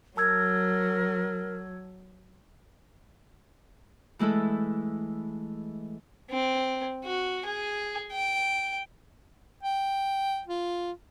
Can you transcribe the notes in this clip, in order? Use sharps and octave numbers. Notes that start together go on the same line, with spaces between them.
F#3 A#4 A5 E6 G#6
E3 G#3 A3 E4 A4
C4
F#4
G#4
G5
G5
F4